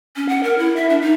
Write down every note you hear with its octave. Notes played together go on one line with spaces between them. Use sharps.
C#4
F#5
A#4
E4
E5
D4
D#4